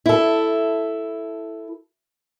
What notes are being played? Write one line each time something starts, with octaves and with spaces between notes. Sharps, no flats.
E4 A4